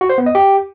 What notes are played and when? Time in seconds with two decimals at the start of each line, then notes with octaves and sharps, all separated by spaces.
0.01 F#4
0.09 C5
0.18 B3
0.26 D#5
0.35 G4